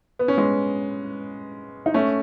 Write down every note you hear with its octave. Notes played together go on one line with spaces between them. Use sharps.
B3
C#4
G#3 B3
D#4
A3 C#4